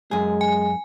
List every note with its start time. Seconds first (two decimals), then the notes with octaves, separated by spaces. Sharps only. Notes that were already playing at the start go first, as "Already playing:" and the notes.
0.11 F#2 G#3 G#4
0.41 G#5